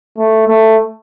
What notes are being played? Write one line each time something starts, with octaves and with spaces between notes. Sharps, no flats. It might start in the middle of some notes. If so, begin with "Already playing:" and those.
A3
A3